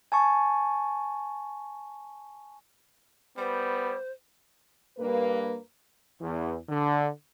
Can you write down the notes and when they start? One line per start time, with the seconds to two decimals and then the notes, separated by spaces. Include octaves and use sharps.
0.12 G#5 A5 C#6
3.38 G3 B3 C5
4.98 G2 A#3 B4
6.20 E2
6.69 D3